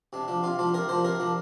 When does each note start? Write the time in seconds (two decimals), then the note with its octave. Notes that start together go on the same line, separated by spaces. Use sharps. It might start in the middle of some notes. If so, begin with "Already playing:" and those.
0.13 C3 D4
0.28 F3 D4
0.43 C3 F4
0.59 F3 D4 F4
0.74 C3 A#4
0.89 F3 D4 C5
1.04 C3 A#4
1.20 F3 D4